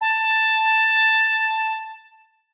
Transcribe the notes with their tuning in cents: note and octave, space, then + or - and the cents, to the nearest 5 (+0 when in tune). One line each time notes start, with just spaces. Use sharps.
A5 +5